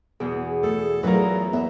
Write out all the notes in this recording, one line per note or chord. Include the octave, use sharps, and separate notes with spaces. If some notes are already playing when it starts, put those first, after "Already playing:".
E2 B2 G#4
A3 A4
E2 F#3 A3 F4 A#4 B4
E2 B3 E5